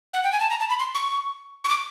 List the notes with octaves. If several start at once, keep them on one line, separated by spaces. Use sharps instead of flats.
F#5
G5
G#5
A5
A#5
A5
B5
C6
C#6
C#6
D6